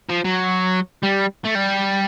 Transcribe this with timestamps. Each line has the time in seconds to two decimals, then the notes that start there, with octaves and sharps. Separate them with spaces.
0.10 F3
0.25 F#3
1.03 G3
1.44 A3
1.55 G3